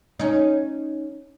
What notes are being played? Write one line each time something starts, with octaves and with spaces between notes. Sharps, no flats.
C#4 D#4